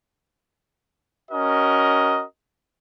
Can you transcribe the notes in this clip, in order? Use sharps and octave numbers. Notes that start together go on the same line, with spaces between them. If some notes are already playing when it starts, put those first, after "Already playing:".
C#4 F#4 A#4 D#5